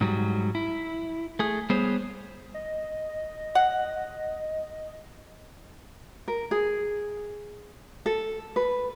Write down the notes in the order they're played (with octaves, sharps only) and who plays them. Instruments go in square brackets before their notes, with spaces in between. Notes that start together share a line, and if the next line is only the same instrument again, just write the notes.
[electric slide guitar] G#2 F#3 G3
E4
A3 G#4
G3 B3 G#4 C5 C#5
[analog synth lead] D#5
[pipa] F#5
[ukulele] A#4
G#4
A4
B4